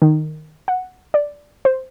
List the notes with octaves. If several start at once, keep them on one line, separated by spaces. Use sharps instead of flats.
D#3
F#5
D5
C5